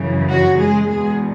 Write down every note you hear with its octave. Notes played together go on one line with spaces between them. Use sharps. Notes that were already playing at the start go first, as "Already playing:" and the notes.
Already playing: F#2 C#3 E3
F#3 F#4
G#3 G#4
E2 B2 G#3 G#4